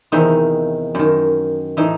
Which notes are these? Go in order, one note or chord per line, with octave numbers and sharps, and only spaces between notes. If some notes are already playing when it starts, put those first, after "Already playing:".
E2 C3 D#3 D#4
F#2 D#3
A2 E3 D#4